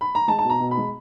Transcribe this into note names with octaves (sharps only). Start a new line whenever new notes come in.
B5
A#5
G#3 A5
A5
B2 A#5
B2
B5
G#3